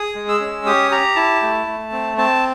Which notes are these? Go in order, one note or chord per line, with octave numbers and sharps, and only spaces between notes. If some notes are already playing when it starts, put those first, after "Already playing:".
Already playing: G#4 D#6
G#3
E6
C#4
G4 D#6
G4 A#5
E4 A5
A3
A3
C4
C4 A5